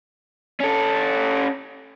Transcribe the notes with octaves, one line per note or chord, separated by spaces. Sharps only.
C#4 A4